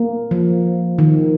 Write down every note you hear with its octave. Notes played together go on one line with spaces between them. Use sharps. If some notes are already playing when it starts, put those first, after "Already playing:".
Already playing: A#3
F3
D#3